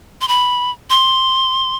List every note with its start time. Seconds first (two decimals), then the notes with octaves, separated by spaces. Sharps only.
0.21 C6
0.28 B5
0.90 C6